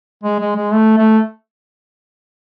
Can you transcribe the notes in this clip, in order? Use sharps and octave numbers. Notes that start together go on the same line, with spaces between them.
G#3
G#3
G#3
A3
A3